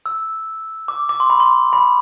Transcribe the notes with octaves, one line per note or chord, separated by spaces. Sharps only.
E6
D6
D6
C6
B5
C6
B5